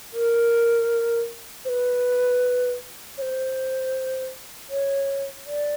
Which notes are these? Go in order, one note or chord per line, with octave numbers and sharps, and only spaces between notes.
A#4
C5
B4
C#5
C5
C#5
D5